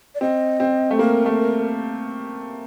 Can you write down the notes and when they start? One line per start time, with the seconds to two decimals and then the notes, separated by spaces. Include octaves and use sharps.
0.15 D5
0.21 C4 D#5
0.60 C4
0.91 A3
0.99 A#3 A#4
1.26 A3